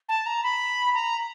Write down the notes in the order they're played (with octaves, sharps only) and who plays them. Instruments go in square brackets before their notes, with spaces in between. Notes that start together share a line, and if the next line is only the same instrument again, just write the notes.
[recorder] A5
A#5
B5
A#5